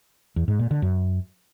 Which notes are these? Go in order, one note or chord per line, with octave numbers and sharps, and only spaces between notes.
E2
G#2
A#2
D3
F#2